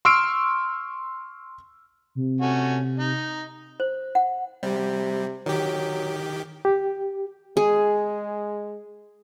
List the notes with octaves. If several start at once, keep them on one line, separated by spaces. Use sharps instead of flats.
C6 C#6 E6 F6 C7 D7
C3
A3 C#4 F#4
D#4
C5
F#5
C3 G3
D#3 F#3 G4
G4
G#3 G#4